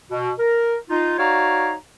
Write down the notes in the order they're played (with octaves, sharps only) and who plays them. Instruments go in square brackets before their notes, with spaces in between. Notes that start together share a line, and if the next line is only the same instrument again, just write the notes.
[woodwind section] B2
A#4
D#4 F4
D#4 F#4 C#5 D5 F5 A#5